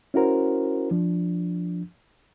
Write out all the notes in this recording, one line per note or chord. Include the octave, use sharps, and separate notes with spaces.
C#4 E4 F#4 A#4 C5
F3 D4